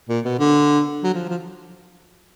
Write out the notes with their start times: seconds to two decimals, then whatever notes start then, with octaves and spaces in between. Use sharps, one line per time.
0.09 A#2
0.24 B2
0.39 D3
1.03 F#3
1.13 F3
1.29 F3